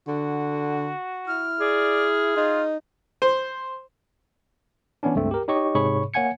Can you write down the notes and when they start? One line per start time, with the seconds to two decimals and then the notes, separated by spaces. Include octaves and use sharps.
0.07 D3 F#4
1.27 E4 F6
1.61 G#4 D5
2.37 D#4 F4
3.22 C5
5.03 E3 B3 C#4 D4
5.15 C#2 G2 A3 C4
5.31 G4 A#4
5.48 D#4 G4 C#5 D#5 C#6
5.75 G#2 C3 G#4 C#5 B5 C#6
6.14 A#3 C#5 F#5 G#5 G#6 C#7